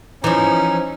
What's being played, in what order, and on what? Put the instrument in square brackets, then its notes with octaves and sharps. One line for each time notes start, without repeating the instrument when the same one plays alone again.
[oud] E3 F3 [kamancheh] C#4 [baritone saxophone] D#4